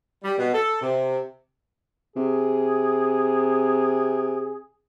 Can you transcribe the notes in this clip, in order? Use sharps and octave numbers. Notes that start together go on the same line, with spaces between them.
G3
B2
A4
C3
C3 G#4